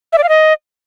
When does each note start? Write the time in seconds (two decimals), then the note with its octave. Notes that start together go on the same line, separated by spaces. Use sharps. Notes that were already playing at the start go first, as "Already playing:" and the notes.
0.13 E5
0.18 D5
0.23 F5
0.29 D#5